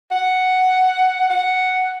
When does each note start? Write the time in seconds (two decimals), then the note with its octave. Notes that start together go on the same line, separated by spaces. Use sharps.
0.11 F#5
1.30 F#5